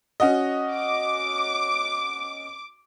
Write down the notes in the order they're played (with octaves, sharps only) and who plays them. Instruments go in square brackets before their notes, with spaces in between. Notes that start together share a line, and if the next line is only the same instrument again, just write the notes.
[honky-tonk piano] C#4 F#4 D#5
[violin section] D6